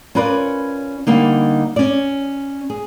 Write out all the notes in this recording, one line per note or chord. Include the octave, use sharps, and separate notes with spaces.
C#4 F4 A#4 B4 C#5 D5
D3 G3 A#3 D#4
C#4 D5
G#4